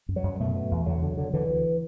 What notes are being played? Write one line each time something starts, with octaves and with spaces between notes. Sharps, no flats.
F#2
F#3
F#2
B2 A3
B2
E2
D3 F#3
D3
D3
D3 E3
D2